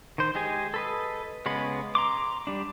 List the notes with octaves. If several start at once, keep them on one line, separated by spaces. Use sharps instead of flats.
D#3 C5
G#3 G4 G#4 G#5
A4 B4 D#5
C#3 G#3 B3 B5
A#5 C6 D6
G3 D4